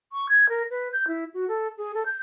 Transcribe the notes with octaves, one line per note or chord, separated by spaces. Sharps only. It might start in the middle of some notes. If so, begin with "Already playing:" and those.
C#6
G#6
A#4
B4
G6
E4
F#4
A4
G#4
A4
G6